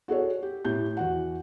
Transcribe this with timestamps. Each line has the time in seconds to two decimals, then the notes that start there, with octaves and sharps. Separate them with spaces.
0.08 F#4 G#4 A4 C#5
0.43 G4
0.65 A2 G4 G6
0.97 E2 F#4 F#5